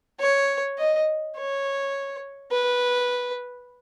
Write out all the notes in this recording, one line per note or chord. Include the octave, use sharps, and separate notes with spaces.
C#5
D#5
C#5
B4